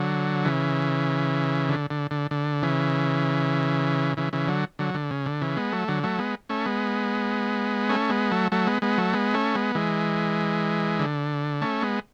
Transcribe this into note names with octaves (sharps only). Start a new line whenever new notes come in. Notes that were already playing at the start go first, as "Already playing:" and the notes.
Already playing: D3 F#3
C#3 E3
D3
D3
D3
D3
C#3 E3
C#3 E3
C#3 E3
D3 F#3
D3 F#3
D3
C#3
D3
C#3 E3
G#3 B3
F#3 A3
D3 F#3
F#3 A3
G#3 B3
A3 C#4
G#3 B3
A3 C#4
G#3 B3
F#3 A3
F#3 A3
G#3 B3
G#3 B3
F#3 A3
G#3 B3
A3 C#4
G#3 B3
E3 G#3
D3
A3 C#4
G#3 B3